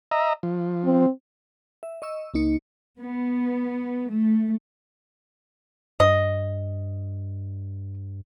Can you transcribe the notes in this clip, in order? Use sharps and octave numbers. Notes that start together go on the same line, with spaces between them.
D#5 E5 A#5
F3
C4
E5
D#5 C#6 E6
C#2 A#3 D#4 C#7
B3
A3
G2 D#5